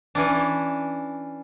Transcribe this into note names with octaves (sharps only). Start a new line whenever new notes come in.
E3 C#4 D4